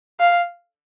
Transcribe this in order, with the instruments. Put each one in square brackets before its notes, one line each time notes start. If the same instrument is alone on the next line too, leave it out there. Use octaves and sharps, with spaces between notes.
[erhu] F5